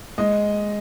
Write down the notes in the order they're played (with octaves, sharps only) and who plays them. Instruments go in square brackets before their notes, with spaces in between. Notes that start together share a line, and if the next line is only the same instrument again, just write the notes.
[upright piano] G#3 D#5